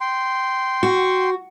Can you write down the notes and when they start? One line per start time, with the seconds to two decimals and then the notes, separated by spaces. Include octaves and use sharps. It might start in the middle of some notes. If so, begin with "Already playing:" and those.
0.01 G5 C6
0.83 F#4